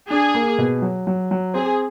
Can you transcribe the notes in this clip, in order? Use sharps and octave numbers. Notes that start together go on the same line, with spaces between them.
D4 G#4
A#3
B2
F#3
F#3
F#3
C4 G#4